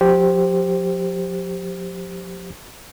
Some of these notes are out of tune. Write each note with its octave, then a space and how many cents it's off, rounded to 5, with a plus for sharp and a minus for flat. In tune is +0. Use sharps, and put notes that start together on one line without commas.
F3 +45 G4 +0 C5 +0